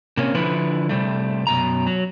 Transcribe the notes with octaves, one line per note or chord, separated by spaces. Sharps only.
C3 A#3 C#4
D3 F3 E4 B4
C3 G3 A3
F#2 B2 A#5
F#3